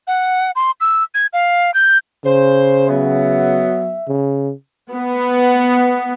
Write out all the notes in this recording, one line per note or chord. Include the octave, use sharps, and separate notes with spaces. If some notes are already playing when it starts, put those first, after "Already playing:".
F#5
C6
E6
G#6
F5
G6
C#3 C5
F#3 B3 E5
C#3
B3